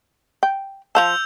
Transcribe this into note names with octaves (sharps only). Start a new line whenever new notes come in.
G5
F3 F5 A5 E6 G6 F7